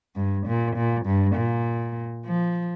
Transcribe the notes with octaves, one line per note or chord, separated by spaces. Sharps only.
G2
A#2
A#2
G2
A#2
F3